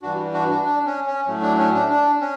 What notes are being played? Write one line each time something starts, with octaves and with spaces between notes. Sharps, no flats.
G2 E3 G3 D4 F#4
D4 F#4
D4
D4
C#4
C#4
A2 F#3 A3
D4
C#4
D4
D4
C#4